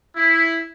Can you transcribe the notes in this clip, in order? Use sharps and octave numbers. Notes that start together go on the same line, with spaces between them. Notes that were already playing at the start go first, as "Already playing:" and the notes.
E4